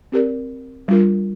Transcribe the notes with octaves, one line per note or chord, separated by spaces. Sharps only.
C4 G4 A#4 D5
G3 D4 F4 A#4